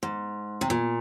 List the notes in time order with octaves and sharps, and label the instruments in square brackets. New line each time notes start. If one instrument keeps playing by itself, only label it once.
[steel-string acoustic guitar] G#2
C3
A#2